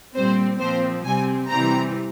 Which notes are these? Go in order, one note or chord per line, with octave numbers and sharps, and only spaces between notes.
A#2 G3 C4 C5
A#2 F3 C4 C5
C3 G3 C4 G#5
C3 E3 G3 C4 A#5